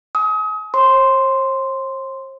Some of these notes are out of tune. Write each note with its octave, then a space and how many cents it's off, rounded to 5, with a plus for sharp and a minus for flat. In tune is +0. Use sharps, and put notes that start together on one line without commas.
G#5 +35 D#6 +35
C5 +45 C6 -5